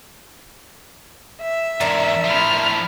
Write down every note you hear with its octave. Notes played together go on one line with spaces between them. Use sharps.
E5
E2 G#2 D4 A#4
A2 F3 B5 F6